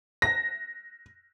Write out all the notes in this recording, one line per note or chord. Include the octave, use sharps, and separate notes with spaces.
A#6